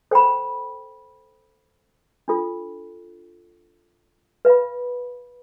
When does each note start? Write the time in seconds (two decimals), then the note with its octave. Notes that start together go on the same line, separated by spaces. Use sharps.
0.11 A4 C5 G5 B5
2.28 D4 F4 A4
4.45 B4 F5 B5